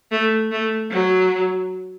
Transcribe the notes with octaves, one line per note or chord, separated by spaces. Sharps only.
A3
A3
F#3